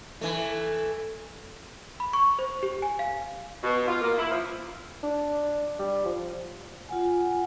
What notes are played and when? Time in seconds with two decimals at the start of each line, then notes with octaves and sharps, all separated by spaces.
0.21 E3 A3
2.00 B5
2.13 C#6
2.39 C5
2.63 G4
2.82 G#5
2.99 F5
3.63 B2
3.87 F4
4.01 A#3
4.18 E4
4.31 F3
5.03 D4
5.79 G3
6.06 F3
6.89 F4 F#5 G#5